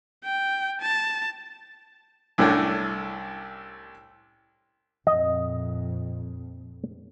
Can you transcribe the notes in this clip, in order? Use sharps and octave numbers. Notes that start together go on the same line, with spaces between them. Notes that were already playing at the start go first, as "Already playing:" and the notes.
G5
A5
C2 A2 C#4 D4 A4
F2 A#2 D#5